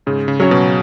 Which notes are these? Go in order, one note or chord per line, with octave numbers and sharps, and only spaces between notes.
G#2 C#3
C#3
F#3 C#4
B2